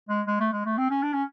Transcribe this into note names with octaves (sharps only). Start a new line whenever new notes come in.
G#3
G#3
A3
G#3
A3
C4
C#4
D4
C#4